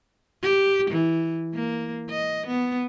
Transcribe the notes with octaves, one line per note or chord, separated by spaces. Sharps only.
G4
E3
A#3
D#5
B3